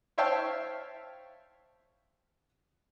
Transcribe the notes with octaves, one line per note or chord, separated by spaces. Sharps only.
C5 C#5 E5 F5 G5 A5